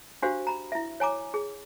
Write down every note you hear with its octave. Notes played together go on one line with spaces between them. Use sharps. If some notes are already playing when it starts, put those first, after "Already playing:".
D4 F#4 G4 C5 F5
A#5 B5
E4 E5
C#5 G#5 A#5 D6
G#4